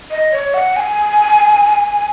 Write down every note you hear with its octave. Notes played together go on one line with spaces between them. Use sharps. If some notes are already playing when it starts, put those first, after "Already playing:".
D#5
C#5
F#5
G#5